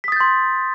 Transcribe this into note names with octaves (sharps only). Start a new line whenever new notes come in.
C6 D#6 G6 A6 B6